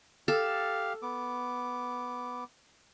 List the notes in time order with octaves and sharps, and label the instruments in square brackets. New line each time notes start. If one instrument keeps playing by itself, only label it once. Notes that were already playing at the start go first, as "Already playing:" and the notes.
[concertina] G4 F5 [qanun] A4
[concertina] B3 D6